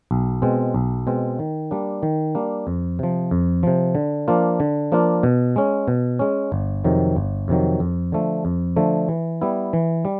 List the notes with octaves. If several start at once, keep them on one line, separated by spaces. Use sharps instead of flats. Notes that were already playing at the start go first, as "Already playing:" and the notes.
B1
B2 G#3 C4
B1
B2 G#3 C4
D#3
G3 A#3 D4
D#3
G3 A#3 D4
F2
C3 F3
F2
C3 F3
D3
F3 A#3 D4 F4
D3
F3 A#3 D4 F4
B2
G#3 C#4
B2
G#3 C#4
G1
F2 C3 D#3 F#3
G1
F2 C3 D#3 F#3
F2
D3 F3 A3
F2
D3 F3 A3
E3
G3 B3 E4
E3
G3